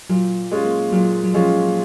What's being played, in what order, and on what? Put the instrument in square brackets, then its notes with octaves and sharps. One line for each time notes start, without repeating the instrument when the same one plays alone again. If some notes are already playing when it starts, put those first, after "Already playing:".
[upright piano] A#2 [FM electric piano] F#3
[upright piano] G#3 C#4 F4
[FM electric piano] A#3
[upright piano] A#2 [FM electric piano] F#3
[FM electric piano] F#3
[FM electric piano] F3 [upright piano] G#3 C#4 F4